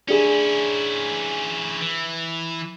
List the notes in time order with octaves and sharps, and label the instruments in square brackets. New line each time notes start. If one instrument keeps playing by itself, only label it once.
[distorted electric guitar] C#4 E4 [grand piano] D4 G#4
[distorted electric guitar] E3